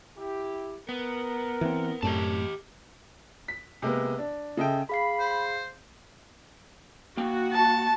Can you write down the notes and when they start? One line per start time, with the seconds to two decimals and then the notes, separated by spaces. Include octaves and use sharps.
0.17 E4 G4
0.89 B3 A#4
1.61 E3 C4
2.03 F#2 A2 C4 G4 D#5 A5
3.48 B6
3.82 C3 G#3 A#3 B3
4.19 D4
4.57 C#3 A4 D#5 E5 G5
4.89 G#4 F5 B5 C7
5.20 C5
7.17 A#3 F#4 G5
7.53 A5